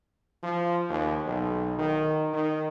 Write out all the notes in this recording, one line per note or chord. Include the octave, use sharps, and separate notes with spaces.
F3
D#2
B1
D#3
D#3